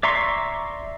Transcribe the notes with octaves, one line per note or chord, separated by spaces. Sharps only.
D5 E5 A#5 C6 C#6